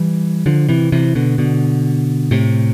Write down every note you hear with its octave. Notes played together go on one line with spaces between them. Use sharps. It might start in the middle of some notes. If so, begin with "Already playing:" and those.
Already playing: E3 G3
D3 F3
C3 E3
C3 E3
B2 D3
B2 D3
A2 C3